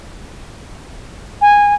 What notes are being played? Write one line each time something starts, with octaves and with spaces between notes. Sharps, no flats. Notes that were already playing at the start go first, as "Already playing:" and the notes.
G#5